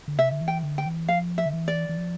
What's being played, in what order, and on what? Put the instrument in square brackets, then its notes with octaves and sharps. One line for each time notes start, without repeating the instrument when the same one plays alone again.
[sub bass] D3
[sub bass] C3 [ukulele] E5
[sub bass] D3
E3
[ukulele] G5
[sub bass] D3
[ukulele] G5
[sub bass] E3
[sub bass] F3 [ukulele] F5
[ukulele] E5
[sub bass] D3
E3
[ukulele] D5
[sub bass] E3
F3